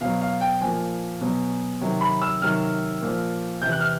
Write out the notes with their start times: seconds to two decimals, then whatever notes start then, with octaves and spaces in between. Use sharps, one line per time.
0.01 B2 F#3 F5
0.21 F5
0.41 G5
0.61 A#2 F3 G#5
1.21 B2 F#3
1.81 C3 D#3 F#3
2.01 B5
2.22 E6
2.42 C3 D#3 F#3 F6
3.02 A#2 F3
3.62 C3 E3 G6
3.72 F#6
3.80 F6